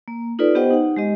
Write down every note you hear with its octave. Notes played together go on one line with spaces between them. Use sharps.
A#3
D#4 F4 A4 B4 D5
B3 G4 C5 D#5 F#5 G5
D#4 F#5
G#3 G4 D#5